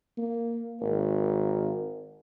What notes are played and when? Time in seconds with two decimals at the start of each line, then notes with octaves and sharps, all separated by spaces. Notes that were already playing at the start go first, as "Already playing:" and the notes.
0.18 A#3
0.81 G#1 A#4